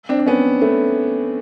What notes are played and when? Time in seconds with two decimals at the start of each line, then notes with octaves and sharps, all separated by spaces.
0.09 C4 D4
0.19 D4
0.26 B3 C#4
0.61 A3 B3